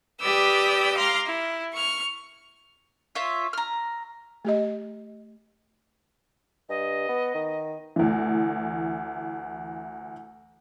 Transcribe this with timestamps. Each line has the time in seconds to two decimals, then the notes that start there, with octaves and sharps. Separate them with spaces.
0.21 G4 B4 D5 D#6 E6 G6
0.96 F5 A#5 C6 D6 F6
1.25 E4
1.73 C#6 F6
3.15 F4 C#5 E5
3.53 A#5 F6
4.45 A3 G4 D#5
6.69 G2 D#5
7.08 B3
7.35 D#3
7.96 D2 E3